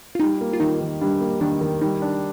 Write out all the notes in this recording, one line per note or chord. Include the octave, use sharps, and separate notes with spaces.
F4
G3 D#4
A#3
F4
D#3 D#4
D#3
G3 D4
A#3
D#3 D4
D#3
G3 D#4
D4